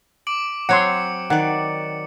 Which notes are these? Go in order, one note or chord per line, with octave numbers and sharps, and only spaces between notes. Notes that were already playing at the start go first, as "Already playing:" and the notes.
D6 D7 F#7
F#3 C4 C#5 F#5 C6 C#7
D#3 D5 F#5